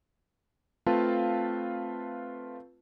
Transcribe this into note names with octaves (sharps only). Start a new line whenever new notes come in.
A3 C4 F4 B4 F5 A5